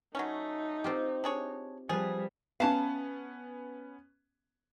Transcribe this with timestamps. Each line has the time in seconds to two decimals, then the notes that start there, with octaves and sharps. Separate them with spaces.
0.15 F#3 A3 C#4 D#4
0.84 C4 F4 G4
1.24 D4 G#4 C#5
1.89 F3 G3 G#4 B4
2.60 B3 C#4 F5 A5